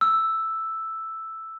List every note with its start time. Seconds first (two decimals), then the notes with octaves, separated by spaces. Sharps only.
0.01 E6